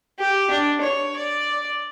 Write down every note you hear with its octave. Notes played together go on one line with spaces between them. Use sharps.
G4
D4
C#5
D5